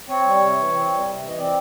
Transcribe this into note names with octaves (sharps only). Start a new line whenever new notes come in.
C4 C#5
G3
C3
E3
C4
G3
C3
E3
D#5
C4 D5